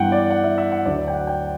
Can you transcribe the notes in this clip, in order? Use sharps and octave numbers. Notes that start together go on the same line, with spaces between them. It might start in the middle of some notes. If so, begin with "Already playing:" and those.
Already playing: G2 E3 B3 F#5 G5
D5
F#5
E5
E5
F#5
D2 D3 F#3 D5
G5
F#5
G5